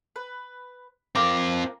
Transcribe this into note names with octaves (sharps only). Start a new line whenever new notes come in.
B4
C4 F4 A#4 D6